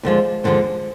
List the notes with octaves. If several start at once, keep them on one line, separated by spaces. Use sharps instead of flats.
D#2 D3 F3 G#3
D#2 D3 F3 G#3